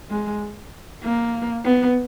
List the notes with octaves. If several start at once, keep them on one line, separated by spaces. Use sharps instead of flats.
G#3
A#3
B3